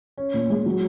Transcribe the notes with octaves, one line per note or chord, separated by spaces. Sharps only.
C#4
A#2
G#3
F#3